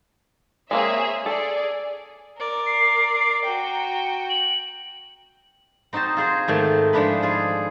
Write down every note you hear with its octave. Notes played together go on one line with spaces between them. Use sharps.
G#3 A#3 C4 G#4 C#5 E5
G#4 A4 D5
A#4 D5
C7
F#4 G5 A#5
F#7
C4 D#4 F#4 C5 A5
F4 G#4 C5
G#2 D#3 A3 A5
F3 G#3 D4 E4 B4
F4 G#4